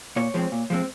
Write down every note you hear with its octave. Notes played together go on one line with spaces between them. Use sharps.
A#2 C#5
F3 G#3 C4
A#2
F3 G#3 C4